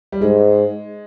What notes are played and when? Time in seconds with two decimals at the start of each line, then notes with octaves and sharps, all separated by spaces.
0.12 G3
0.21 G#2 G#3